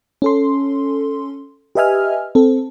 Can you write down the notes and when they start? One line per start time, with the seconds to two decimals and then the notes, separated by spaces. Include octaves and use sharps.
0.22 C#4 A4 C6
1.75 G4 B4 D#5 E5 G#5 F6
2.35 C4 A4